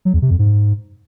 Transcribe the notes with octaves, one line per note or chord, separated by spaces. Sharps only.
F#3
E2
C3
F2
G#2